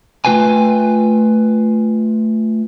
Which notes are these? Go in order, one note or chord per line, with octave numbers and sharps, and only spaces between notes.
A3 F4 B4 G5 G#5